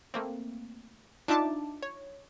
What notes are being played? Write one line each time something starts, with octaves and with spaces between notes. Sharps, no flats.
A3 A#3 C4
D4 D#4 F4 E5 A5 D6
C#5